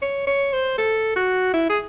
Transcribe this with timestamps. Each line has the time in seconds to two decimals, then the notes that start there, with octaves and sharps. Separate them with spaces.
0.02 C#5
0.27 C#5
0.53 C5
0.78 A4
1.16 F#4
1.54 E4
1.69 G#4